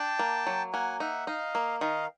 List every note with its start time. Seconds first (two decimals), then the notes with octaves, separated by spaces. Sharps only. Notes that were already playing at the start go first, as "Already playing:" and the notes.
Already playing: D4 G5 A5
0.19 A#3
0.47 F#3
0.73 A#3 F#5 G#5
1.00 D#4 E5 F#5
1.27 D#4 D#5 F5
1.55 A#3
1.81 D#3 D#5 F5